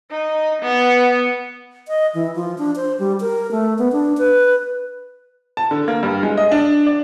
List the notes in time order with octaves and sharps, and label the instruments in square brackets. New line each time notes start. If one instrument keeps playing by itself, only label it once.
[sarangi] D#4
B3
[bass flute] D#5
E3
F3
D4
C5
G3
A#4
A3
B3
D4
B4
[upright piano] A5
D3
A#3
G2
G#3
D#5
D4
D5